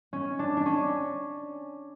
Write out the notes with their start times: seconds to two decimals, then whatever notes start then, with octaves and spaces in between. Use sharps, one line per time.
0.13 C#4
0.39 D4
0.57 D4
0.66 C#4